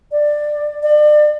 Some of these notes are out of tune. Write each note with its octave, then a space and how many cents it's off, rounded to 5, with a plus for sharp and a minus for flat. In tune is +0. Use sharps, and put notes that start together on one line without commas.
D5 +15
D5 +35